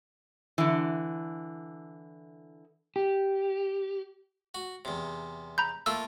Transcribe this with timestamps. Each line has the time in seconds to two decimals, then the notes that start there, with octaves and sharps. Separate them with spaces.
0.58 D3 E3
2.96 G4
4.55 F#4
4.85 E2 C3
5.58 A#5 B5 G6
5.86 A3 A#3 F4 E6